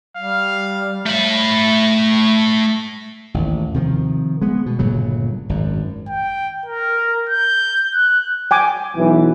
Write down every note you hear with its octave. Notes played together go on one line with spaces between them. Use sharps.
G3 F5
A3 B5
A1 D#2
C3 D#3 F3
G#3 B3
B2
G1 A#2 C#3 F#3
G#1 F#2
G5
A#4
G6
F#6
G5 G#5 D6
B1 E3